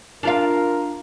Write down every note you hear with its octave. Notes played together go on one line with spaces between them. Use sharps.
D4 F4 A#4 F5